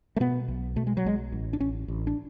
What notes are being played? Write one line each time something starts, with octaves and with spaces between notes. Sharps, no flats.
A3
B2 B3
B1
B2 A3
G#3
F#3
B1 G#3
A1
D4
A1 C#4
A1
D4